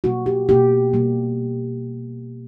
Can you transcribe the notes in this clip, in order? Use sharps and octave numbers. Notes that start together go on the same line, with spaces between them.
B2 G3 A#3 F#4
G4
B2 G3 A#3 G4
B2 G3 A#3